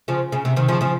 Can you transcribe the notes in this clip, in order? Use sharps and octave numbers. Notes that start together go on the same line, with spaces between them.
C#3 F3
C#3
C3
C3 D#3
C#3 F3
C#3 F3